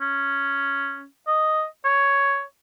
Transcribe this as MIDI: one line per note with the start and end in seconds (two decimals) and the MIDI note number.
0.01 1.05 61
1.27 1.64 75
1.85 2.42 73